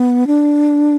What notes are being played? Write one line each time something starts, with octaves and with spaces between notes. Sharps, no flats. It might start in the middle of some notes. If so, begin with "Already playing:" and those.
Already playing: B3
D4